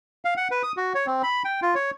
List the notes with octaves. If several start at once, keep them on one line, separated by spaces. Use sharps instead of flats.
F5
F#5
B4
D#6
F#4
C#5
C4
B5
G5
F4
C#5